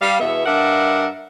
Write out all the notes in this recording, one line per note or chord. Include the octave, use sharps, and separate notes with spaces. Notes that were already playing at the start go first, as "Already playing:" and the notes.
G3 F5
E2 B2 B3 E5
G2 D4 A#4 E5 F#5